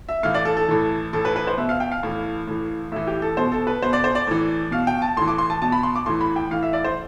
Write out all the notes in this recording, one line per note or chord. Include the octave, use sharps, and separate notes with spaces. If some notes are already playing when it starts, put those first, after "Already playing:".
E5
A2 E3 F5
D5
A4
A4
A2 E3
A2 E3 A4
B4
B4
C5
B2 E5
F5
G5
F5
A2 E3
A2 E3
A2 E3 E5
G4
A4
B2 C5
A4
B4
B2 C5
D5
C5
D5
A2 E3
B2 F5
G5
A5
A2 E3 C6
D6
C6
A5
B2 A5
B5
C6
D6
A2 E3 C6
B5
G5
A2 E3 F5
E5
D5
C5